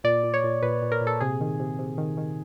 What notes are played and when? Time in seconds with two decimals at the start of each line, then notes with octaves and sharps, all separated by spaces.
0.04 A#2 D5
0.24 A#2
0.34 C#5
0.44 A#2
0.62 A#2 B4
0.82 A#2
0.92 A#4
1.01 A#2
1.07 A4
1.21 C3 G#4
1.41 D#3
1.60 C3
1.79 C3
1.98 D#3
2.17 D#3